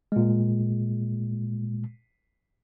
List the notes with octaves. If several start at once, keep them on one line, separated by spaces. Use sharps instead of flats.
A#2 G#3